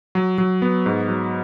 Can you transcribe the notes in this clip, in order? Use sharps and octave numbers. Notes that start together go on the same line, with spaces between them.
F#3
F#3
B3
G#2
F#3